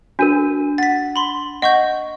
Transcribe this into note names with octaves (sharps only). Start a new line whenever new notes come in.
D4 F#4 A#4 D#7
F#5 A6 B6
B5 C6
D#5 F#5 C#6 G6